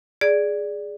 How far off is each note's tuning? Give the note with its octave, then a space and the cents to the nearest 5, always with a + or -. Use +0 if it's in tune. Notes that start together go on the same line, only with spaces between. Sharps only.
G#4 +0 D5 +0